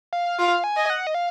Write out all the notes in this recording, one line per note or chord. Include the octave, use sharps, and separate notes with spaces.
F5
F4 F5
G#5
D#5
F#5
D#5
F5